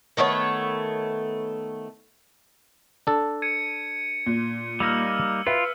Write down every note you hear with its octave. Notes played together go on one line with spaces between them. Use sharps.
D#3 A3 B3 C#5
D4 A4
G#6 C#7 D#7
A#2
G3 A#3 D#4 E6 F6
F4 B4 E5